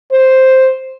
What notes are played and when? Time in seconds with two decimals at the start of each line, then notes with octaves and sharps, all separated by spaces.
0.12 C5